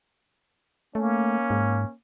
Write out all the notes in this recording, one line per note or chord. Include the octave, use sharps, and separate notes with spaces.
A3 A#3 C#4
G#2